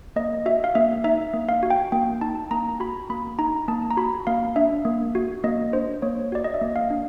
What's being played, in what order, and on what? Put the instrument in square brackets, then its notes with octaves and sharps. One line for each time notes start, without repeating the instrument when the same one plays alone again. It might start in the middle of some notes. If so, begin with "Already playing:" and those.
[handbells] A#3 D#5
F#4 E5
F5
A#3 E5
D#4 E5
A#3
F5
F#4
G5
A#3 G5
D#4 A5
A#3 A#5
F#4 B5
A#3 B5
D#4 A#5
A#3 A5
A#5
F#4 B5
A#3 F5
D4 E5
A#3
F#4
A#3 D#5
D4 C5
A#3 C#5
F#4 D5
D#5
E5
A#3
F5
D4